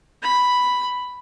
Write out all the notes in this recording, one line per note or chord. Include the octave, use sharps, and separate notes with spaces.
B5